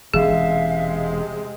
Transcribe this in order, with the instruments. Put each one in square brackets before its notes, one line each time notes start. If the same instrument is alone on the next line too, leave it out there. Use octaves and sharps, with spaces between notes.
[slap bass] E1 E3 C#4 [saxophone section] C3 G#3 [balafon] G#4 [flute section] E5 F5